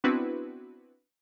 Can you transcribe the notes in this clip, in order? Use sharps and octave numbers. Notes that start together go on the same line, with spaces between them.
B3 C4 D4 E4 F#4 B4